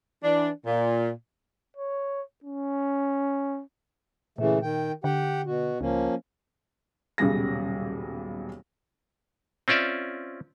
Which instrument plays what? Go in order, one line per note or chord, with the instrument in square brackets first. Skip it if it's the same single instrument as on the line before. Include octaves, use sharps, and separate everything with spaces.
[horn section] E3 D4
A#2
[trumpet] C#5
C#4
[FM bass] A#2 [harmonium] C#3 E3 A3
[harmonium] D#3 G5
[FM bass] D3 [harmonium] G4 F#5 G5
[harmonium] B2 F#4
[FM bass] C#2 [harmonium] F3 A#3 C#4
[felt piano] D#1 B1 C#3 G3 G#4 A#6
[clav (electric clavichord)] C4 C#4 F4 D5 E5